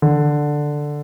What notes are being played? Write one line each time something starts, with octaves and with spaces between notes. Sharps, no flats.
D3